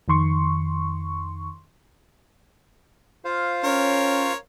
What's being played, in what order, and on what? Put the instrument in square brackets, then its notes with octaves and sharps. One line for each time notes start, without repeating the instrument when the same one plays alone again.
[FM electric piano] F2 D#3 C6 C#6
[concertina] F4 C5 F5
[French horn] C#4 [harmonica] A#4 C#5